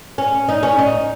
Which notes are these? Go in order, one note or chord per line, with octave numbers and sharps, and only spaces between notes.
C#4
D#4
C#4
D#4